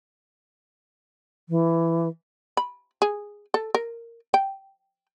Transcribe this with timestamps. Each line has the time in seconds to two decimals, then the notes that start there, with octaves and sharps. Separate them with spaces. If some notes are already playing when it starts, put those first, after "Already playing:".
1.49 E3
2.57 B5
3.02 G#4
3.54 A4
3.75 A#4
4.34 G5